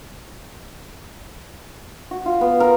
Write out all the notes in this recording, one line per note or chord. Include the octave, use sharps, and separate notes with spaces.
F#4
F4
B3
A#4